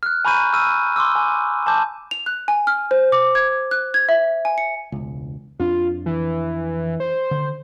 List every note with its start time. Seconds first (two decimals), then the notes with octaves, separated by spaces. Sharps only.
0.03 F6 F#6
0.25 G#5 A#5 B5 C#6 G6 D#7
0.53 C#6 E6 F6 D#7
0.96 C6 D6 E6
1.16 G#5
1.66 G#5 A5 D6 G6
2.11 F7
2.26 F#6
2.48 G#5
2.67 F6
2.91 C5
3.12 D6
3.35 G#6
3.71 F#6
3.94 G#6
4.09 E5
4.45 G#5
4.58 C#7
4.92 E1 C#2
5.60 F2 D4 F4
6.06 E3
7.00 C5
7.31 D3